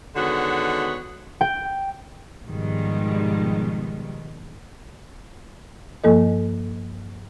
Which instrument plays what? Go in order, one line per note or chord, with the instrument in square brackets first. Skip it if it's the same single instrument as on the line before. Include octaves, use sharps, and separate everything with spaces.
[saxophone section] D3 D#3 G#3 B3 F#4 C#5
[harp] G5
[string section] G#2 B2 D#3 F3 G3 G#3
[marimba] G2 F3 A#3 A4 D#5